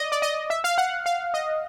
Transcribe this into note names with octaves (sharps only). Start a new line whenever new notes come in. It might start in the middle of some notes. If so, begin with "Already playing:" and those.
Already playing: D5 D#5
D5
D#5
E5
F5
F#5
F5
D#5